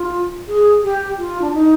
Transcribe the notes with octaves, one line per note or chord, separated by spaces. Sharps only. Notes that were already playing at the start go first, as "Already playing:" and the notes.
Already playing: F4
G#4
G4
F4
D4
D#4